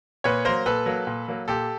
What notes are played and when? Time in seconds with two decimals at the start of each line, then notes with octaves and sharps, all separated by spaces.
0.24 A#2 B4 C#5
0.45 F#3 A#3 A#4 C5
0.66 A#2 A4 B4
0.86 F#3 A#3
1.07 A#2
1.28 F#3 A#3
1.48 A#2 G4 A4